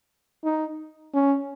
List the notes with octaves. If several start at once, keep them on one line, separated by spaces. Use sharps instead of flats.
D#4
C#4